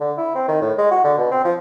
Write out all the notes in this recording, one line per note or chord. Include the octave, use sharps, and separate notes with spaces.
D3
E4
C4
D#3
A2
G#3
F#4
D3
B2
C4
F3